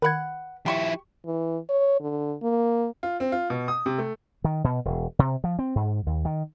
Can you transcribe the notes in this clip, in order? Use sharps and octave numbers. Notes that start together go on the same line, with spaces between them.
D#3 B4 F#5 B5 G#6
F3 E4 G4 C6 C#6
E3
C#5
D3
A#3
F4
C4
F4
B2
D#6
C3
A3
D#3
B2
E1
C3
F3
C4
G#2
D#2
D#3